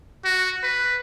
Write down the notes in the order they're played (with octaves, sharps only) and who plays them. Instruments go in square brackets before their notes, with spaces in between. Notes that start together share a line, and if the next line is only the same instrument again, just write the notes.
[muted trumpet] F#4
B4